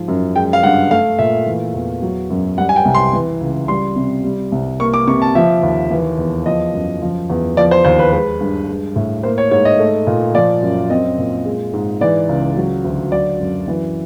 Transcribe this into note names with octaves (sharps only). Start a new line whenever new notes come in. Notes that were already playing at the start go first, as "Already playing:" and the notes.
Already playing: G#2 F3
F#2
G#3 G5
F5
G2 F#5
A3 F5
A#2 E5
E3
E2
F#3
F#2
G3 F#5
G#5
G5
C2
C6
E3
C#2
G3 C6
C3
G3
C2
A#3 C#6
D6
C3 C#6
A5
F3 E5
D#2
E3
E2
F3 D#5
F#2
F3
E2
F3 D5
C5
D#2 C5
B4
G#3 B4
G2
G#3
A2
A#3 C5
C#5
G#2 C#5
D#5
A3
A#2
F3 D5
F#2
C4 D#5
A#2
G#3
G#2
E3 D5
C#2
F#3
D2
F#3 D5
F#2
E3